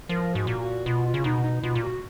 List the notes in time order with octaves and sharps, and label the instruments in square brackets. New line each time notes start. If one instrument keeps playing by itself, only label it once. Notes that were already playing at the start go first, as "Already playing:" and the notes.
[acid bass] F3 [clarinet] A#4
[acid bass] G#2 [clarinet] F#4
[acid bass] A#2
[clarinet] F#4
[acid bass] B2 [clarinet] F4
[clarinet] F4
[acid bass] C#3
[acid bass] B2 [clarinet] D#4
[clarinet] D#4
[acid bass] B2 [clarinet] F4
[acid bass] A#2
[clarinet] F#4